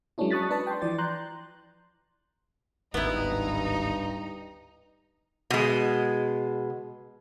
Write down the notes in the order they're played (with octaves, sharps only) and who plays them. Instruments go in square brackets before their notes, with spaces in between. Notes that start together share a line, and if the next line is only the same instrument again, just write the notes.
[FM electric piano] F#3 G#3 A#3 C#4 D4 E4
A5 C#6 D#6 F#6 A6 B6
D4 B4 D5 A5
G5 C6
E3 F3 D5 A6
A#5 C6 F#6 G6
[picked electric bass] D1 G#1 [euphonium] G2 [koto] B3 E4 [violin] D#4
[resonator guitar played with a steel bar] B2 G#3